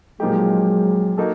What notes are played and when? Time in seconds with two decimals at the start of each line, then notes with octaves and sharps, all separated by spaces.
0.20 A#2 F3 F#3 G#3 A#3 D#4 G4
1.18 A#3 D#4 F#4 A4